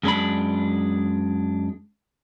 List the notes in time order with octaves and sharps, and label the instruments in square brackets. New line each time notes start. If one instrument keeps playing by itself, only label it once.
[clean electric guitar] F#2 G#3 D4 B5